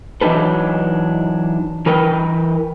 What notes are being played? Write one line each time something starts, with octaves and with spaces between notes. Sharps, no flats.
E3 F#3 D4 D#4 A4 B4
E3 A#4 B4 G5